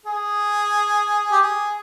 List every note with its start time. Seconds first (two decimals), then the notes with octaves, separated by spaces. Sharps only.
0.06 G#4
1.32 G4
1.41 G#4